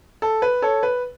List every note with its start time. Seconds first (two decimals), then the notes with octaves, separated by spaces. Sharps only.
0.22 A4
0.42 B4
0.62 A4 C#5
0.83 B4